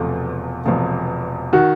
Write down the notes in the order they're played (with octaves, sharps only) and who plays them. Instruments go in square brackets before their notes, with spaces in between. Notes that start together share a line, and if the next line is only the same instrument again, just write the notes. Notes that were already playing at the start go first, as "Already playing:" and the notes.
Already playing: [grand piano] E1 E2 C3 F3 A3
E1 E2 C3 F3 A3
[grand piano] D#3 [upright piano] F#4